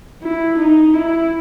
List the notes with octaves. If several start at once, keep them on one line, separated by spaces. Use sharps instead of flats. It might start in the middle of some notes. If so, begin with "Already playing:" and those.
E4
D#4
E4